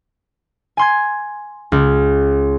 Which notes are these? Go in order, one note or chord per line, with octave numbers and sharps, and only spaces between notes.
G#5 C6 G#6
C#2